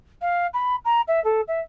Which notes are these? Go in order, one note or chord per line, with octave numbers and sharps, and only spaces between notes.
F5
B5
A#5
E5
A4
E5